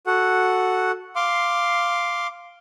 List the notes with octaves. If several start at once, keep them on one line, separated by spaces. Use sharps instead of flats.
F#4 A4 F#5
F5 C6 D6